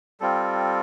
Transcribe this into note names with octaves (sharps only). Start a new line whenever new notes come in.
G3 C4 F4 A4